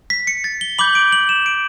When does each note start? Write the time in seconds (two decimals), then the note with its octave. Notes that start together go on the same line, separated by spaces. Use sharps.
0.10 B6
0.27 C#7
0.44 A6
0.61 G7
0.79 B5 D6 G6 F#7
0.95 D7
1.12 F#7
1.29 E7
1.46 D7